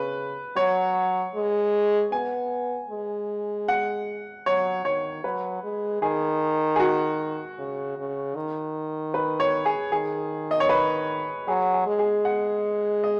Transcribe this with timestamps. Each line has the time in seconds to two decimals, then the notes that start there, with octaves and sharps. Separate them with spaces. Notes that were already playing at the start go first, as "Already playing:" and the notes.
Already playing: C#3 B4
0.56 F#3 C#5
1.35 G#3
2.12 B3 G#5
2.90 G#3
3.68 F#5
4.46 F#3 C#5
4.85 D#3 C#5
5.24 F#3 B4
5.63 G#3
6.02 D#3 G#4
6.76 G#4
6.80 F#4
7.58 C#3
7.97 C#3
8.36 D#3
9.14 B4
9.40 C#5
9.65 G#4
9.92 D#3 G#4
10.51 D#5
10.60 C#5
10.69 B4
11.47 F#3 G#4
11.73 G#4
11.86 G#3
11.99 G#4
12.25 F#5
13.04 D#5